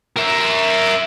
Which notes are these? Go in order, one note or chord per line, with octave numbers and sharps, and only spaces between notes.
A#4 E5